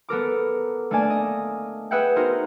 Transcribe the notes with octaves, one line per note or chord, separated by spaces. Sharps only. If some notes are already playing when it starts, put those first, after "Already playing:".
B3 A4 A#4 D6
A3 A#3 D4 D5 G#5 A5
D#5
G#4 B4 E5 F#5 G5
B3 D#4 F#4 A#4 C5